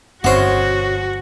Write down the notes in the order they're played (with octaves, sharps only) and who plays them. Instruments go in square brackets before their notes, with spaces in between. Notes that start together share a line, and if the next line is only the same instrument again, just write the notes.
[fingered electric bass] G1 C4 [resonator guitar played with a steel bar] F#2 B2 C#5 [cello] F#4 [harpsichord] C5 F#5